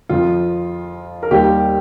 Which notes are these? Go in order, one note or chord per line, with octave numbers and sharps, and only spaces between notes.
F2 F3 F4
A#4
D#2 D#3 G3 G4